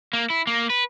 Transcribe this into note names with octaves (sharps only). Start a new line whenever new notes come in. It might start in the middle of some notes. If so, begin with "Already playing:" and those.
A#3
E4
A#3
B4